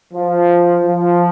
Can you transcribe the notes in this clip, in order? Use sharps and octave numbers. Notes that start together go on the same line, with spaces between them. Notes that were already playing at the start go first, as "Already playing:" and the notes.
F3
F3